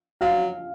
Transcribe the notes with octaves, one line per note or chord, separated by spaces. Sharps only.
F#3 F5